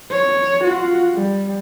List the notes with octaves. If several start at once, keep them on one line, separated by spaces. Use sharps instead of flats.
C#5
F4 F#4
G3